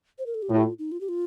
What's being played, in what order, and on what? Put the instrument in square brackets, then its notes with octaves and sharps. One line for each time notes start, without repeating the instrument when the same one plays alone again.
[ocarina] C5
A#4
A4
G4
[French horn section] A2 [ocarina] F4
[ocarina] G4
F4
D#4
F4
G4
F4